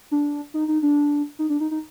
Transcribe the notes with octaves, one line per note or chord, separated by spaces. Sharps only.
D4
D#4
D#4
D4
D#4
D4
D#4
D#4